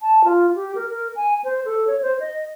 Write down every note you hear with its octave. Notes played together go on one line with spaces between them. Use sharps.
A5
F4
G4
A#4
A#4
G#5
C5
A4
C#5
C5
D#5